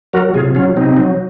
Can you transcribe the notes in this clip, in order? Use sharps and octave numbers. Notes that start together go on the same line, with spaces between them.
F#3 F#4 A#4
C3 F4 G#4
F#3 C#4 F4
C3 C4 D#4
F#3